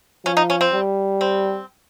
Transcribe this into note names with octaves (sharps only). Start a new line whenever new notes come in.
F3 C#4
D#4
C#4
C4
G3
C4